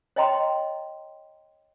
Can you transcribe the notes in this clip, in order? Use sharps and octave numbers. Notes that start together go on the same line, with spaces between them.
C#5 D#5 G5 A#5 C6